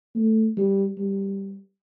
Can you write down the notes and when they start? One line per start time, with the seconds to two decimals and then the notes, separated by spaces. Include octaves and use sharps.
0.16 A3
0.57 G3
0.98 G3